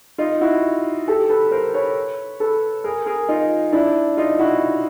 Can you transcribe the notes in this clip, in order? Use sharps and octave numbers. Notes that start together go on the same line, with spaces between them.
D#4 F4
E4 F#4
G4 A4
A4 B4
A#4 C5
B4 C#5
A4 B4
G#4 A#4
G#4 A#4
D#4 F4
D4 E4
D#4 F4
E4 F#4